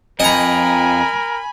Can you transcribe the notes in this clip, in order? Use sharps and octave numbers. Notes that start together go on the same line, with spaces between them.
F2 A#4 D#5 G#5 A#5 B5